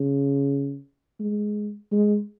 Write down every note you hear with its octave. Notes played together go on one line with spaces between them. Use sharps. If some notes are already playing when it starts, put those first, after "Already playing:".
Already playing: C#3
G#3
G#3